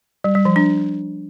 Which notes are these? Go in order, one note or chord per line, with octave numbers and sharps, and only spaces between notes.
G3
G3
F3
D4